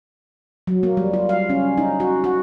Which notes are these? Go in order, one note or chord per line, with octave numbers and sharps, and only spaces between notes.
F#3
A#3
G3
F4
F5
C#4
D#4
F#4
F#4